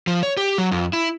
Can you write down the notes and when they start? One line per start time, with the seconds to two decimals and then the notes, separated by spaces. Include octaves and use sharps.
0.07 F3
0.23 C#5
0.37 G4
0.58 F#3
0.72 F2
0.93 E4